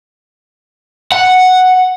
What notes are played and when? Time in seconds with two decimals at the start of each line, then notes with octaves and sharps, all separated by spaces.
1.12 F#5